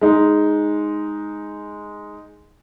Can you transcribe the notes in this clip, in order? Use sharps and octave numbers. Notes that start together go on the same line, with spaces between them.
G#3 D#4